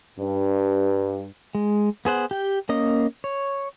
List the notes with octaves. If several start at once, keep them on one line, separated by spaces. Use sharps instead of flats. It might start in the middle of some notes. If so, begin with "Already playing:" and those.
G2
G#3
B3 G#4 C5 F#5
G4 G5
A#3 C#4 D#5 D#6
C#5